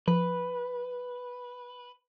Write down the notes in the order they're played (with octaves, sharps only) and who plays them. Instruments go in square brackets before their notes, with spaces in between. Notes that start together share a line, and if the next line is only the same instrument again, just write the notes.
[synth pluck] F3 [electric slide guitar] B4